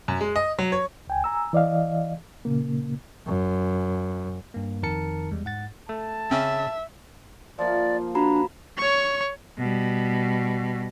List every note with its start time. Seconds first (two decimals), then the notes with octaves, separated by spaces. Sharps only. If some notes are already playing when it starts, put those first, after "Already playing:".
0.08 F#2
0.21 G#3
0.36 D#5
0.59 F#3
0.72 C#5
1.07 C#2 G5 G#5
1.24 G#5 A#5 E6
1.53 E3 D5 D#5 F5
2.45 A#2 C#3 A#3
3.26 F#2
4.54 G2 A#3
4.83 F2 D#3 A#4 A5 C#7
5.31 E2 G3 G#3
5.45 G#2 F#5 A6
5.89 A3 A5
6.31 C#3 C4 C#4 E5 G5
7.58 F3 A#3 D5
8.15 D4 F#4 A#5 B5
8.78 C#5 C#6
9.58 B2 G3